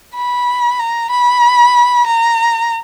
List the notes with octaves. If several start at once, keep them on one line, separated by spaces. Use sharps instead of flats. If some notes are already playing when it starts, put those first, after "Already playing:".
B5
A#5
B5
A#5